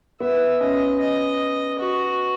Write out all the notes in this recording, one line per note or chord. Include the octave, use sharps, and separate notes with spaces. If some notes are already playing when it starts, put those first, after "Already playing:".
B3 E5
C#4 D#5
D#5
F#4